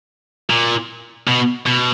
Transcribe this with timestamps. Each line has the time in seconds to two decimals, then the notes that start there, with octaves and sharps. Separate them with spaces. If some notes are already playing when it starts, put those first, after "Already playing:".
0.50 A#2
1.28 B2
1.66 B2